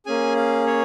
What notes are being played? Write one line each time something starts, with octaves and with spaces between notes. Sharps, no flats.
A#3 C#4 G#4 G#5
F5
C#5